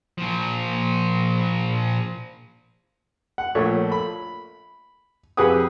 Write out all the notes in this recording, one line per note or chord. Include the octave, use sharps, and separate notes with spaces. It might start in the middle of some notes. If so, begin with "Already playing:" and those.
A#2 F3
F#5
A#1 A3 C#5
B5
F2 G4 G#4 B4 F#5 D#6